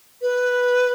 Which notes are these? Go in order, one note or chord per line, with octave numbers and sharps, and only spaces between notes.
B4